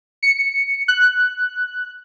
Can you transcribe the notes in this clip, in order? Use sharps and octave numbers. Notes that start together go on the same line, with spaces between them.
C#7
F#6